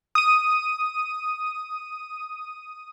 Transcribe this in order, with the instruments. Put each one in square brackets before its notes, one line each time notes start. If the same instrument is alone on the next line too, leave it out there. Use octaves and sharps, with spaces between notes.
[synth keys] D#6 D#7